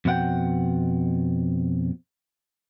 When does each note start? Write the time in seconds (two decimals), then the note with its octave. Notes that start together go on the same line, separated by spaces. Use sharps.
0.05 F2 B2 D#4 F#5 G5